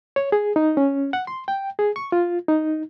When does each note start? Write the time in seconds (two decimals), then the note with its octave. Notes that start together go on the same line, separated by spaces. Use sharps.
0.16 C#5
0.32 G#4
0.56 D#4
0.77 C#4
1.13 F#5
1.27 C6
1.48 G5
1.79 G#4
1.96 C#6
2.12 F4
2.48 D#4